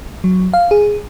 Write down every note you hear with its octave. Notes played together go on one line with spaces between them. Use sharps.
F#3
F5
G#4